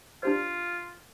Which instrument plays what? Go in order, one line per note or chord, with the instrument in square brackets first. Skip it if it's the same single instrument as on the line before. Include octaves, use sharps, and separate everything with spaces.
[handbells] D4 G4 C5 [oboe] F4